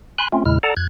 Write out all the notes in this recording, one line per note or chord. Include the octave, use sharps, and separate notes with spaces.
G#5 B5 C6 F#6
A3 C4 C#4 F4
E2 A#2 C#3 G#3 E4 F6
A4 D5 F#5 A5 A#5
F2 F#6 G#6